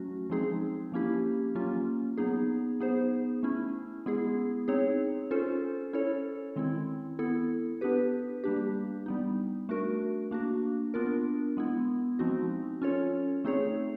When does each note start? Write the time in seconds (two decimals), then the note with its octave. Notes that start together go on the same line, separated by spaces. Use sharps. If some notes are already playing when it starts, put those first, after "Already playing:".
Already playing: F#3 A3 C#4 F#4
0.30 F3 G#3 C4 D#4 G#4
0.92 F3 A#3 C#4 E4 G4
1.55 F#3 A#3 C#4 F4
2.18 F#3 B3 D#4 G#4
2.80 B3 D#4 G#4 C5
3.43 A3 C#4 E4
4.06 G#3 B3 E4 G#4
4.68 C4 D#4 G#4 C#5
5.31 C#4 F4 A4 C5
5.93 C#4 E4 A4 C#5
6.56 D#3 G#3 C4 E4
7.19 B3 E4 A4
7.81 B3 D4 G4 B4
8.44 G3 A#3 D4 G4
9.06 G3 B3 D#4
9.69 A3 D4 F#4 A#4
10.31 A#3 D4 F#4
10.94 B3 D4 F4 A#4
11.57 G#3 B3 E4
12.19 F3 G#3 C4 D#4 F#4
12.82 C#4 F4 A4 C#5
13.44 A3 C4 D#4 G#4 C#5